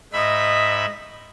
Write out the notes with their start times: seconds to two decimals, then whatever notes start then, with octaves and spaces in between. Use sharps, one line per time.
0.13 G#2 D#5 E5 B5